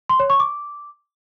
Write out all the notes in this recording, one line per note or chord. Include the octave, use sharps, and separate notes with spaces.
C6
C#5
C#6
D6